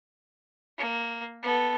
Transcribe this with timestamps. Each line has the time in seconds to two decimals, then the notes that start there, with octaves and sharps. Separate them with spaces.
0.78 A#3
1.43 B3 A4